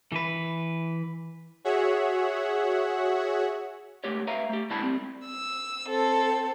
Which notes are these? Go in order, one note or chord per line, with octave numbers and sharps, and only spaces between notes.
E3 B4
F#4 G#4 C#5 E5 F#5
C#2 A3 G4 C#5
B4 E5 F5 A#5
A3 G4
D2 G3 G#3 E4 A5 B5
G3 C4
E6
C4 A4